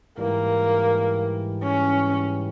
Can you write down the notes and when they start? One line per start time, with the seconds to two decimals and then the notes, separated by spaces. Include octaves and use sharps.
0.18 G#2 E3 G3 A#3
1.63 C#4